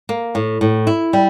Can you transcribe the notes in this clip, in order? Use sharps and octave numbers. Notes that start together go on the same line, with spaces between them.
A#3
A2
A2
E4
G3